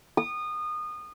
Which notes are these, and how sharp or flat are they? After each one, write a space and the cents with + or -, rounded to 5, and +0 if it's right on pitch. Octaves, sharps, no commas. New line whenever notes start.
D#6 -25